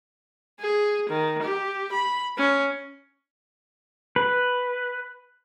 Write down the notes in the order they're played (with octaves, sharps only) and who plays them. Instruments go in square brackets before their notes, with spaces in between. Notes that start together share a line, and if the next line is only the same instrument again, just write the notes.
[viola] G#4
D#3
G4
B5
C#4
[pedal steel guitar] B4